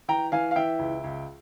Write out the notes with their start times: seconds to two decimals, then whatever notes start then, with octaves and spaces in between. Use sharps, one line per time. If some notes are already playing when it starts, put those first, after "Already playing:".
0.08 E3 G5 A#5
0.32 E3 F5 G#5
0.51 F5
0.56 E3 E5 G5
0.79 C#2
1.04 C#2